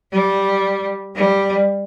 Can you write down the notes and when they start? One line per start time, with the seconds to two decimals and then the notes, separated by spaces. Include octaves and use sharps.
0.11 G3
1.15 G3